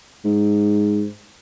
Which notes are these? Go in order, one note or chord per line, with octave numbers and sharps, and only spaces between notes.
G#2